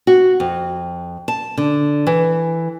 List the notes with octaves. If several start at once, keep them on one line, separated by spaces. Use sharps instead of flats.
F#4
F2
A5
D3
E3